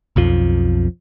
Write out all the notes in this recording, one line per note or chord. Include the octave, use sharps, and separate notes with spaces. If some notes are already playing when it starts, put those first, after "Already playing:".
B1 F2 F3